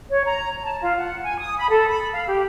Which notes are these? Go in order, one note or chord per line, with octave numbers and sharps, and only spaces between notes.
C#5
A#5
A5
F4
F#5
G#5
D#6
B5
A4
B5
F5
G4